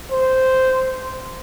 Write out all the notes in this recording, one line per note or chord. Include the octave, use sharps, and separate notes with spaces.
C5